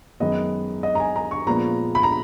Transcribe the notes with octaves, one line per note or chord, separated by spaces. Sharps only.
F#2 D#3 G#3 B3 D#5
D#5
A#5
G#5
A#5
C#6
A#2 F3 G#3 B3 A#5
B5
A#5